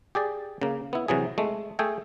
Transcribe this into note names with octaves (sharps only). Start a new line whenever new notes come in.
G4 G#4 D5
C#3 A#3
B3 E4
C3 E3 F#3 G#4
G#3 A3
A3 G#4 A4 G5 G#5